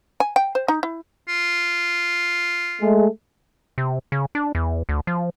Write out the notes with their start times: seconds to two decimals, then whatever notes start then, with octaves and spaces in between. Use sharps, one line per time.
0.20 G#5
0.36 G5
0.55 C5
0.68 D#4
0.83 E4
1.29 F4
2.81 G#3 A3
3.78 C3
4.12 C#3
4.35 D4
4.55 E2
4.89 D2
5.07 F3